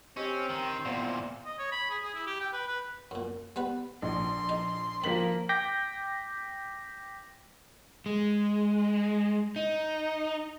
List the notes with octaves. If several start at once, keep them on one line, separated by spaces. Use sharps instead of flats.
C4 C#4 G4 D#5
D#3
E2 A#2 B3 C5 D5
D#5
C#5
B5
G#4
G#4
E4
G4
G5
B4
B4
F#2 A#2
G3 B3 B4
A#1 C6
D#4 D#5
D#3 F3 A#3 B6 F#7
G5 D6 G6 A#6 B6
G#3
D#4